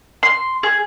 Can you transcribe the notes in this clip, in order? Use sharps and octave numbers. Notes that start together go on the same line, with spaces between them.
C6
G#4